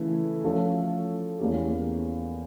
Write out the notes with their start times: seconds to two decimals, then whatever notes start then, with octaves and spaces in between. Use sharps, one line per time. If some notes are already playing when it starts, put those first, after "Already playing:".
Already playing: C#3 E3 A3 E4
0.44 F3 A3 C#4 F4 A4
1.39 E2 E3 A#3 C#4 G4